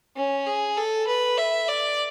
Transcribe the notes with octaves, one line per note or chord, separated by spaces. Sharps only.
C#4
G#4
A4
B4
E5
D5